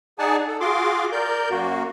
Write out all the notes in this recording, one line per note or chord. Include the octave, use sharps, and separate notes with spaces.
D#4 G#4 D5 F#5 G#5 A5
A4
F4 F#4 G#4 C6 D6
A#4 D5 G6
F#2 A#3 F#4